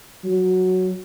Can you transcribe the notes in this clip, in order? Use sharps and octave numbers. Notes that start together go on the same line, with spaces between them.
F#3